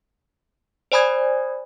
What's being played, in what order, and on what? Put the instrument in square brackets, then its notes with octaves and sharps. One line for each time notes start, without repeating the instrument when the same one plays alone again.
[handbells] C5 D5 G#5 B5 D#6 G#6